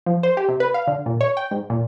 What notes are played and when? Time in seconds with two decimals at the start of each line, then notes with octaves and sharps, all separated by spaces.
0.06 F3
0.23 C5
0.37 G4
0.48 C3
0.60 B4
0.74 F5
0.87 D3
1.06 A#2
1.21 C#5
1.37 G5
1.51 G#2
1.70 A#2